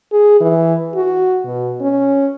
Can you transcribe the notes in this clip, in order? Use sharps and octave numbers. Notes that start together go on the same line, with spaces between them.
G#4
E3
F#4
B2
C#4